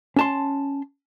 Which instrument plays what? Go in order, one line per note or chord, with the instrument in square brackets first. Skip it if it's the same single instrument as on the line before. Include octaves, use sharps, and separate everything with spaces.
[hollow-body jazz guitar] C#4 A5 C6